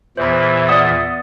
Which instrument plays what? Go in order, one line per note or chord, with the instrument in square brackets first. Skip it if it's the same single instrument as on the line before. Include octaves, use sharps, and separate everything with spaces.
[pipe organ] E2 A#2 E3 [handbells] C5 B5 [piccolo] E5
[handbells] B3 D5 F#5 [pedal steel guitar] D#6